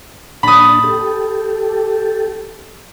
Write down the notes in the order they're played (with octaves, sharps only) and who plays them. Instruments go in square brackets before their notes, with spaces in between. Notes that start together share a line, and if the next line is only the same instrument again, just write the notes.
[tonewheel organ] A#2 D4 A5 [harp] B5 D#6
[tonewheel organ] G4 A4